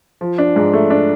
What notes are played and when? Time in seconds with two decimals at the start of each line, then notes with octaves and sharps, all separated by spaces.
0.21 F3
0.38 D4
0.56 G#2
0.73 A3
0.90 D4